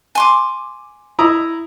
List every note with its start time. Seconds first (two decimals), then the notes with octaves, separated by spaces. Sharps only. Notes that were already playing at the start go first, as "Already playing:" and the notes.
0.15 G#5 C6 D6
1.19 E4 A#5 D#6